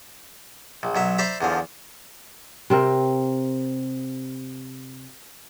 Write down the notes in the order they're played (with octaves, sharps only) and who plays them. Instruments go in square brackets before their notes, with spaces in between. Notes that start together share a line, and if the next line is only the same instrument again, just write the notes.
[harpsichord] A#1
B1 F#3 E5
C5 D5 E5 A#5 B5
E2 D3 F3
[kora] C3 C4 A#4